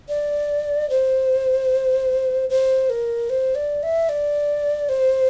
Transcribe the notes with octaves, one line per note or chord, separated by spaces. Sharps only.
D5
C5
C5
A#4
C5
D5
E5
D5
C5